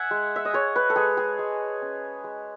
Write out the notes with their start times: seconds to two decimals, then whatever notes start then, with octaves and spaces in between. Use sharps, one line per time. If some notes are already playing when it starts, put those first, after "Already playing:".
Already playing: E5 F#5 G#5
0.11 G#3
0.36 E5
0.45 D#5
0.53 G#3 C#5
0.76 B4
0.90 A4
0.96 G#3 G#4
1.17 G#4
1.39 G#3
1.82 C#4
2.24 G#3